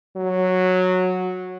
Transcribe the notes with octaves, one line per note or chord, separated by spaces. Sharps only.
F#3